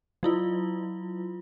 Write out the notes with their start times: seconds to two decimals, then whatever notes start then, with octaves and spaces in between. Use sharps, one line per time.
0.23 F#3 E4 F4